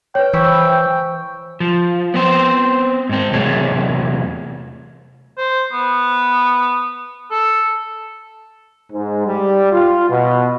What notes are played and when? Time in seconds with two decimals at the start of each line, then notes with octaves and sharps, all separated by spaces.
0.15 B4 C#5 G5
0.34 E3 C5 C#6 E6
1.60 F3
2.14 B3 C4 C5
3.09 G#2 C4
3.32 E2 C3 F#3 A3 G#4
5.38 C5
5.73 B3
7.31 A4
8.92 G#2
9.25 G3
9.72 F4
10.09 B2